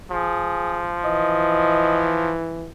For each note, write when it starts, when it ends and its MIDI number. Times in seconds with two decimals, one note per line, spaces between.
0.12 2.32 53
0.12 0.85 68
1.05 2.67 52
1.05 2.09 75